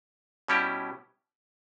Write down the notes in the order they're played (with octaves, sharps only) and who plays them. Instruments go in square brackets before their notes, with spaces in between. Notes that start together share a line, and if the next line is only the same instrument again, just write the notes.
[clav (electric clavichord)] B2 G3 C#4 E4 G4